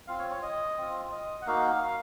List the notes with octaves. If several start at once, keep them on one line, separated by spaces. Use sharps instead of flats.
C4 F4 F5
C#5
C#5
D#5
C4 F4
D#5
F#5
A#3 D#4 F#4 F5